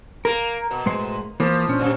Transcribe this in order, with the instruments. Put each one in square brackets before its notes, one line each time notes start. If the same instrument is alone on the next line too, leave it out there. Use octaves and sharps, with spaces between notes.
[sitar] A#3 [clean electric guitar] A#4
[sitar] B2
[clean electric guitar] A2 G#3 C5
[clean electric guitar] E3 A#3 [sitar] F3
[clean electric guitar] A#2 C#4 D4
[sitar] F#2 C3